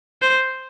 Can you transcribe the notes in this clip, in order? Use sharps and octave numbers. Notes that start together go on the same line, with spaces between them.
C5